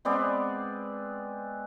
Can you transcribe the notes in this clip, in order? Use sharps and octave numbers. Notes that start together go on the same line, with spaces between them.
G#3 B3 C4 D5